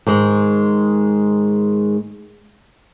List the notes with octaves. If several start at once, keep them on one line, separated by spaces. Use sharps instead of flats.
G#2 D#3 G#3